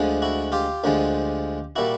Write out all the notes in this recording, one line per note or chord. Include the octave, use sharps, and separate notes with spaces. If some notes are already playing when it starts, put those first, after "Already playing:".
Already playing: D2 D3 F3 G#3
E4 F#4
F4 G4
D2 D3 F3 G#3
A#2 G3 E4 F#4